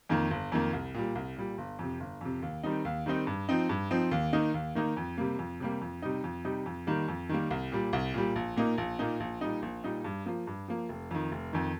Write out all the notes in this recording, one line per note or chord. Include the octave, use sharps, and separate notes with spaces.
F2 D#3 A#3
G1
F2 D#3 A#3
C2
A#2 G3
C2
A#2 G3
G1
F2 C3
G1
F2 C3
D#2
D#3 G3 C4 D#4
D#2
D#3 G3 C4 D#4
G2
F3 C4 D#4
G2
F3 C4 D#4
D#2
D#3 A#3 D#4
D#2
D#3 A#3 D#4
F2
C3 G3 A#3
F2
C3 G3 A#3
F2
C3 G3 D#4
F2
C3 G3 D#4
F2
D#3 G3 A#3
F2
D#3 G3 A#3
C2
A#2 G3
C2
A#2 G3
A#1
A#2 A#3 D#4
A#1
A#2 A#3 D#4
A#1
A#2 G3 D#4
A#1
A#2 G3 D#4
G2
F3 A#3
G2
F3 A#3
F1
F2 D#3
F1
F2 D#3